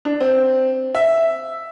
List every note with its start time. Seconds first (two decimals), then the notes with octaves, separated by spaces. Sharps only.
0.05 D4
0.20 C4
0.95 E5